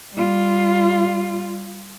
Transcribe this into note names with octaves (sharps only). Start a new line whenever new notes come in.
G3 F4